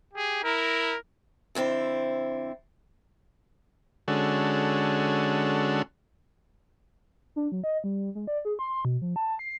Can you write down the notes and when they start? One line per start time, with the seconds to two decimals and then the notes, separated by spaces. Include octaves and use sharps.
0.14 G4 G#4
0.44 E4 A#4
1.55 F2 D3 C4 E4
4.08 D3 G#3 C#4 F#4 A4
7.36 D4
7.52 F#3
7.64 D#5
7.84 G3
8.15 G#3
8.27 D5
8.45 G#4
8.59 C6
8.85 B2
9.02 F3
9.16 A5
9.39 C7